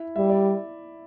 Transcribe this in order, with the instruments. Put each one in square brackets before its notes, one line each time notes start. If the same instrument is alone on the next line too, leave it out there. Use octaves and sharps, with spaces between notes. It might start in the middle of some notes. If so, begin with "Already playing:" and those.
Already playing: [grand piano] E4
[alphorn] G3 [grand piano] E5
[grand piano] D5